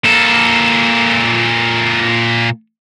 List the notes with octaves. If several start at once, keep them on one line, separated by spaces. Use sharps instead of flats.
A#2 A4